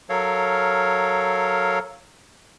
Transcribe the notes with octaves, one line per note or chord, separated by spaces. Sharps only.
F#3 A4 A#4 C#5 F5